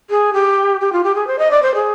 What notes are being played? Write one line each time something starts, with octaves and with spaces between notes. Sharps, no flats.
G#4
G4
G4
F4
G4
G#4
C5
D#5
D5
C5
G#4